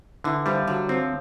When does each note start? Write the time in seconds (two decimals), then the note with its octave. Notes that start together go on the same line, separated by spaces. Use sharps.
0.24 D3 E3
0.46 F3 G3
0.67 D3 F#3
0.89 F3 C4